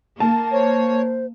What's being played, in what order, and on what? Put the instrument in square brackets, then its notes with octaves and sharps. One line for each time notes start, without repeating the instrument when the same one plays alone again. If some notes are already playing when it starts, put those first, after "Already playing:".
[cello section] A#3 [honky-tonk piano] A5
[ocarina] C5 [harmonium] C#5